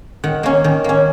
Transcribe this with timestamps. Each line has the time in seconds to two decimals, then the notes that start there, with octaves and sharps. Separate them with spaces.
0.24 D#3 F#5
0.43 A#3 C#4
0.64 D#3
0.84 A#3 C#4